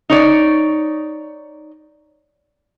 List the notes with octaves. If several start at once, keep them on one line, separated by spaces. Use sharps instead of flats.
D#4 C#5 D5